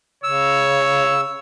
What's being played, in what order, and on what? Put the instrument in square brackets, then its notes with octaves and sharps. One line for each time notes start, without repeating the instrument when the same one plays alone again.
[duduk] C#3 [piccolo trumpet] C#5 [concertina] E6